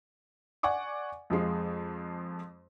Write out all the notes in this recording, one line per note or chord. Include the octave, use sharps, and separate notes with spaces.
D5 F#5 G#5 C#6 D6
F2 F3 G#3